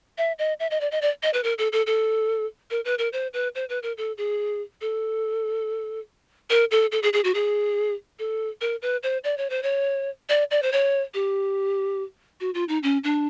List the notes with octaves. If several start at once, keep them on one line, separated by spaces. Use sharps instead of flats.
E5
D#5
E5
D#5
D5
D#5
D5
D#5
B4
A#4
A4
A4
A4
A#4
B4
A#4
C5
B4
C5
B4
A#4
A4
G#4
A4
A#4
A4
A4
G#4
G#4
F#4
G#4
A4
A#4
B4
C5
D5
C#5
C5
C#5
D5
D5
C5
C#5
G4
F#4
F4
D#4
C#4
D4